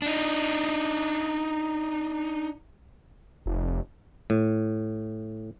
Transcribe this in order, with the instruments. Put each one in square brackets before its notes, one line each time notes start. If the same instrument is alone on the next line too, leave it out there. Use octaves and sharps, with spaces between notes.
[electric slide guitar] D4 D#4
[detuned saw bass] F1
[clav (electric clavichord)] A2